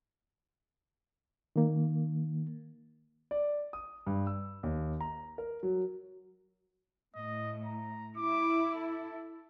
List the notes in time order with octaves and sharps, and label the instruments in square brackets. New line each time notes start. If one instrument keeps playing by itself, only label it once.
[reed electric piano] D#3 A#3
[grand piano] D5
D#6
G2
E6
D#2
A#5
A#4
F#3
[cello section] A2 [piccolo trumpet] D#5
[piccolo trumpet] A#5
[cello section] E4 [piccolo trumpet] D6
[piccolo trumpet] A4